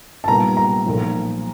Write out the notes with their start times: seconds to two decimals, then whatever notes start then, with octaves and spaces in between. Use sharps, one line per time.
0.24 A5
0.27 B1 A#2 G3 B3 A#5
0.57 A#5
0.85 B1 A#2 F3